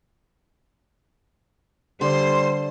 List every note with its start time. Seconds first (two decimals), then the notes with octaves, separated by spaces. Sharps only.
2.01 D3 G3 C5 C6